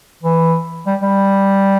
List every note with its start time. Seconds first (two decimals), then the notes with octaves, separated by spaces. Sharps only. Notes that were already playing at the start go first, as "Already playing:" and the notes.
0.23 E3
0.87 G3
1.02 G3